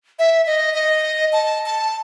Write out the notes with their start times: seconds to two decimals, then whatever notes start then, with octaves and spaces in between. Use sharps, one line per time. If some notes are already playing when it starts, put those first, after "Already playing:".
0.19 E5
0.46 D#5
0.74 D#5
1.33 A5
1.66 A5